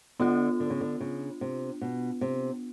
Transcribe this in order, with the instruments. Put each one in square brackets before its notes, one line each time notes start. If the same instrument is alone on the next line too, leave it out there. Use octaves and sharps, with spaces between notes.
[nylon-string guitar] D3 [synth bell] B3 D4 F4
[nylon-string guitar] D3
C#3
D3
C#3
C3
B2
C3